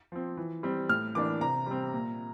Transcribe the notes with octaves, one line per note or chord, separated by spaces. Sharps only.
F3 C4
E3
G3 C4
A2 F6
E3 A#3 D4 D6
C3 A#5
G3 C4
A#2